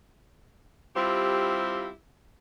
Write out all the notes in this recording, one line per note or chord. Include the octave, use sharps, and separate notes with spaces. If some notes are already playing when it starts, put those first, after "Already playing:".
G3 C4 E4 F4 G4